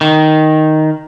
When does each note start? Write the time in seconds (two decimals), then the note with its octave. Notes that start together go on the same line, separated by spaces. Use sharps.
0.01 D#3